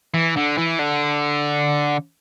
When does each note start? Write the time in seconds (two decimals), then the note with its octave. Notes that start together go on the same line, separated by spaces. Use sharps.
0.14 E3
0.36 D3
0.58 E3
0.79 D3